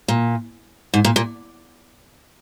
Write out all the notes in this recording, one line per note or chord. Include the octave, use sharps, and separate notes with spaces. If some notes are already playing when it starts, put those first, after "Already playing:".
A#2
G#2
A#2
A#2